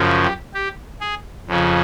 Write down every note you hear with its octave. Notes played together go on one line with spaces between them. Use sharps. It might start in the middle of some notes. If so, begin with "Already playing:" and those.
Already playing: F#2 C#3 F3
G4
G4
G#4
F2 C#3 F3